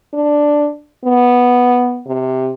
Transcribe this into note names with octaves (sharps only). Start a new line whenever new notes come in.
D4
B3
C3